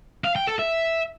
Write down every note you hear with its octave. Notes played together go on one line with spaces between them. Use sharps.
F5
G5
A4
E5